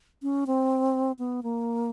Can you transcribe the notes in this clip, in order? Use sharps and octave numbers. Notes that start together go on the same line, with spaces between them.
C#4
C4
B3
A#3